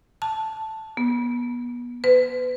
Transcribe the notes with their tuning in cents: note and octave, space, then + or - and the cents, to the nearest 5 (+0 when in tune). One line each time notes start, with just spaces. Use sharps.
A5 +0
B3 -25
B4 +30